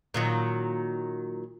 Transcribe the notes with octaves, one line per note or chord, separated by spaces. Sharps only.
A#2 D#3 F#3